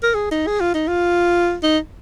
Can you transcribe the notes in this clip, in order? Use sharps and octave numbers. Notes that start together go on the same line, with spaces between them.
A#4
G#4
D#4
G#4
F4
D#4
F4
D#4